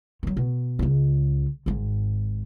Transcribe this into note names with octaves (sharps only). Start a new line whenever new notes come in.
D#3 F#3
B2
C#2 C#3
G#1 G#2